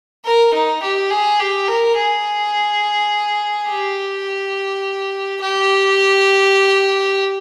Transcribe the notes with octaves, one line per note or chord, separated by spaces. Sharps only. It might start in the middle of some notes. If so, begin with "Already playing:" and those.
A#4
D#4
G4
G#4
G4
A#4
G#4
G4
G4